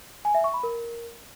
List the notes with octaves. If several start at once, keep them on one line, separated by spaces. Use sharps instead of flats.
G#5
E5
C#6
B5
A#4